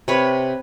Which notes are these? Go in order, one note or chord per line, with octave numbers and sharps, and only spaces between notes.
C3 B4 C#5